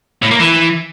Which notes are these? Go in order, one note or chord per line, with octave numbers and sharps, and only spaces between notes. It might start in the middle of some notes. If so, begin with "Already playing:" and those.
A2
A#3
E3